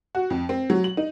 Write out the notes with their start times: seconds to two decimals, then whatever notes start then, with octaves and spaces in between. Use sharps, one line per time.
0.15 F#4
0.30 F2
0.49 C4
0.70 F#3
0.84 F#7
0.97 D#4